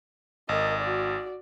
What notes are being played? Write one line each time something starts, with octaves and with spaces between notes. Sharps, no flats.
G#1 A#4 D#5
F#4 D5